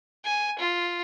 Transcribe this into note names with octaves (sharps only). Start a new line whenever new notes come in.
G#5
F4